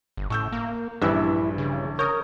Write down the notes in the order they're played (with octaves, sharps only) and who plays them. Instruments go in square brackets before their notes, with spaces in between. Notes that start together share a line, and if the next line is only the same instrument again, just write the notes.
[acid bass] G1
[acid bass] A2 [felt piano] C#6 E6 G6
[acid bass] A#3
[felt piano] A#1 E6 F#6 [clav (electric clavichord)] G2 E3 [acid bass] E4
[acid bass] C#3
[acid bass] A#4 [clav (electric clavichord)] C#5 [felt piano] D#6 G6